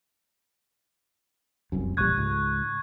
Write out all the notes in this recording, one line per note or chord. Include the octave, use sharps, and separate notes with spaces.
F1 C2 F#2
E1 A#1 G3 C#6 F#6 G#6
C#2 G#2